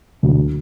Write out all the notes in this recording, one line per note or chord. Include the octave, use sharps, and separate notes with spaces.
D2